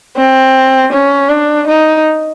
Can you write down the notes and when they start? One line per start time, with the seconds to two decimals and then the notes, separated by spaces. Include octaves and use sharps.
0.17 C4
0.92 C#4
1.29 D4
1.67 D#4